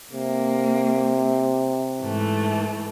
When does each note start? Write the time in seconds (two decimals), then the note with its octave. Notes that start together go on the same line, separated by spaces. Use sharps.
0.12 C3 A#3
2.01 G#2 E3 A3